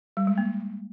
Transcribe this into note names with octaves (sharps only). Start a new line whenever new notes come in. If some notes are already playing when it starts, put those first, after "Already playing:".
G3
G#3
A#3